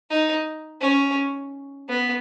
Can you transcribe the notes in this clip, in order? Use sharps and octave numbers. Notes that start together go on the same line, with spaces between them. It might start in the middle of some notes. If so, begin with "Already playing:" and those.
D#4
C#4
B3